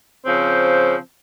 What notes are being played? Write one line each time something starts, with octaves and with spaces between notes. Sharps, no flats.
C#3 F3 C4